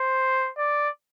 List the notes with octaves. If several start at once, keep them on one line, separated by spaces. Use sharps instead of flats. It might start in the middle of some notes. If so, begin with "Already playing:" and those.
Already playing: C5
D5